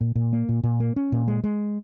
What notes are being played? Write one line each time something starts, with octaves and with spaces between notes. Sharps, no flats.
A#2
A#2
A#3
A#2
A#2
A#3
C#4
A#2
G#3
G#3